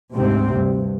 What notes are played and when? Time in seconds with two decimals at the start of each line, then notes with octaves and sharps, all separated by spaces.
0.14 D2 G#2 C3 C4
0.51 G2